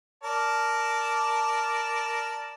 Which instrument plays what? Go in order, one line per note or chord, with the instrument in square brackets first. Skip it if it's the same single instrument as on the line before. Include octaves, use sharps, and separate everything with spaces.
[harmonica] A#4 D5 A5